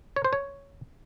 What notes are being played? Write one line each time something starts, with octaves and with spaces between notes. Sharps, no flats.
C#5
C5
C#5